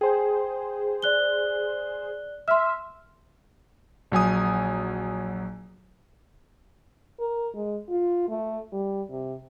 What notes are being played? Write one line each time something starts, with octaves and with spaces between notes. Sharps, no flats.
G#4 C5 G5
D5 F#6 G7
E5 C6 F6
A#1 F#3 G#5 D#6
A#4
G#3
F4
A3
G3
C3